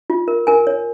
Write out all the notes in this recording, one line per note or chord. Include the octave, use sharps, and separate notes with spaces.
F4
A#4
A#4 G#5
C#5